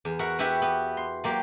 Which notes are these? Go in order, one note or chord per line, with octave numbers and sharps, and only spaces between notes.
E2
F#4 A#4 E5 F#5
B3 E4 F#4 G4 E5 F#5
B3
C6
F#3 A#3 G4